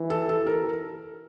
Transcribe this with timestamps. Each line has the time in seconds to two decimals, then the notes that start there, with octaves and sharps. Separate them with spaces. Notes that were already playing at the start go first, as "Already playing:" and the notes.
Already playing: E3
0.10 A4
0.29 A4
0.46 A#4